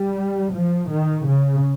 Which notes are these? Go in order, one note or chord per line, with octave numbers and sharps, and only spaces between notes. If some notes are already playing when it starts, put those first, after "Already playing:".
Already playing: G3
F3
D#3
C#3